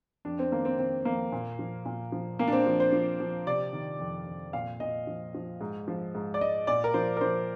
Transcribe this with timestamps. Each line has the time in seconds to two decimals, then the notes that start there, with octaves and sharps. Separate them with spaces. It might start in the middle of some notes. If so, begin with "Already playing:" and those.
0.25 F2 D4
0.39 C4
0.52 D#3 A#3
0.65 C4
0.79 D#3 C4
1.05 F2 A#3
1.32 A#2
1.59 F3
1.85 A#2
2.12 F3
2.39 A#2 A#3
2.48 D4
2.52 C4
2.67 F3
2.80 C5
2.92 F3
3.20 F3
3.47 C3 D5
3.73 D#3
4.00 F2
4.27 F2
4.53 A#2 F5
4.80 A#2 D#5
5.07 F3
5.35 F3
5.61 G#2
5.88 F3
6.15 G#2
6.34 D5
6.41 G#2 D#5
6.67 A#2 D5
6.84 A#4
6.94 F3 C5
7.17 A#4
7.21 F3 C5